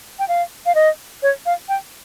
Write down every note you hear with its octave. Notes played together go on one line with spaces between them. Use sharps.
G5
F5
F5
D#5
C#5
F5
G5